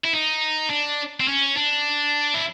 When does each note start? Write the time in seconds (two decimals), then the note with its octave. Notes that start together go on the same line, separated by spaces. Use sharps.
0.04 E4
0.13 D#4
0.70 D4
1.20 C4
1.28 C#4
1.57 D4
2.35 E4